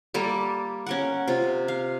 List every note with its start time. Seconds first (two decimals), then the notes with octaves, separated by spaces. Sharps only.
0.14 G3 A#3 G4 A4
0.86 C#4 A#4 F#5
1.28 C3 F4
1.68 F5